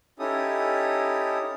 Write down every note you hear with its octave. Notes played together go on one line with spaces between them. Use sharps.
C#4 D#4 E4 G4 A4 D#6